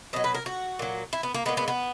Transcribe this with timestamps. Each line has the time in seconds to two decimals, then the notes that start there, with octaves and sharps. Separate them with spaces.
0.13 B2 D#5
0.16 F#3
0.24 B4
0.35 A#4
0.46 F#4
0.79 A#2 F#3
1.13 E4
1.23 B3
1.34 A#3
1.45 G#3 B3
1.48 A#2
1.57 B3
1.68 B3